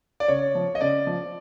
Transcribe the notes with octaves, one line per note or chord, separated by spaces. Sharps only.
D5
C#3 C#5
F3
D#5
C#3 D5
F3